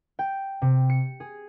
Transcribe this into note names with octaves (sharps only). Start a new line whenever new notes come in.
G5
C3
C#7
G#4